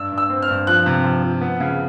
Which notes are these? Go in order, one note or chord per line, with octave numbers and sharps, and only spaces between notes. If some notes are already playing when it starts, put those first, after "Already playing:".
Already playing: G2 E6
G2
E6
C4
F6
G2
F3 F#6
C3
F3
F3
B3
C#3